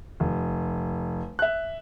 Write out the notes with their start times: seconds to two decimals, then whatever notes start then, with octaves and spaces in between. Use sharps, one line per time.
0.20 F1
1.39 E5 F#6